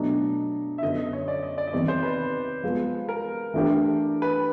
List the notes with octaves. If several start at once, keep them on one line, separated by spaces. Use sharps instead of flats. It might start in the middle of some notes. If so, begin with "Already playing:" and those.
Already playing: B2 F#3 A3 D4 D#5
E5
F#2 D3 F#3 B3 D#5
D#5
C#5
D5
D#5
D5
D#5
E2 C3 D#3 G3 C4 D5
C5
B4
F3 G#3 B3
A#4
E3 A3 D4 G4
B4